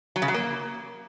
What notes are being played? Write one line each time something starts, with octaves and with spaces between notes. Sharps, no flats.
F#3
C#3
F#3
A#3